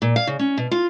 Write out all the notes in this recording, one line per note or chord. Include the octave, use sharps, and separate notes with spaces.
A#2
F5
C#3
C#4
B2
F4